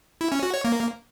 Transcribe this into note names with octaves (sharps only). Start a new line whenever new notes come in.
E4
C#4
F#4
C#5
A#3